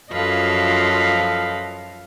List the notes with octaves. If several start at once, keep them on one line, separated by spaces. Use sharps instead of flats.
F#2 F3 A4 B4 D#5 F5